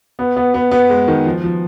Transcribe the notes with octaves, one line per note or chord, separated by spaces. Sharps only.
B3
B3
B3
B3
G#3
D#3
F3
F3